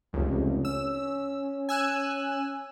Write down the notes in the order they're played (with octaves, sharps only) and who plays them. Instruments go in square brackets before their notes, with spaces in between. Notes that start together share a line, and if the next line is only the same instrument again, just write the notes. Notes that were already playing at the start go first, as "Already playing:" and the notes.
[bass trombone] F1 [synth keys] C#2
[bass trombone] C#4 [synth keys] E6
[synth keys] G#5 E6 F#6